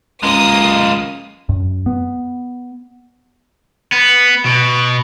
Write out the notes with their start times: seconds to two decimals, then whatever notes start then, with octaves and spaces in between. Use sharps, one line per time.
0.23 C#2 G#3 A#3 D#6
1.49 F#2
1.86 B3
3.92 B3
4.46 B2